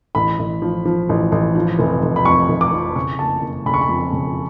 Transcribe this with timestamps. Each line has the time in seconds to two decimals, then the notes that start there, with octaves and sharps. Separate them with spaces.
0.15 A1 B5
0.39 A1
0.62 F3
0.85 F3
1.09 A1
1.32 A1
1.56 F3
1.79 F1
2.02 F1
2.16 B5
2.25 F2 C#6
2.49 F1
2.61 D6
2.73 F3
2.96 C#3 C#6
3.19 F#1 A5
3.42 F#1
3.66 C#3 B5
3.74 C#6
3.81 B5
3.89 F2
4.13 C#3